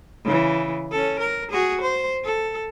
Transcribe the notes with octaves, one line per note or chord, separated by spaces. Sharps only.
C#3 E3
C#4 A4
A#4
F#4 G#4
C5
A4